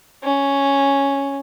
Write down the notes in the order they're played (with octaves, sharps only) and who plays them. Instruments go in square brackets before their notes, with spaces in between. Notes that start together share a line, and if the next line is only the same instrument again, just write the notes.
[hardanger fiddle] C#4